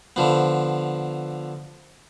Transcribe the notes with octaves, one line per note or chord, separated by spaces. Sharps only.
D3 F3 B3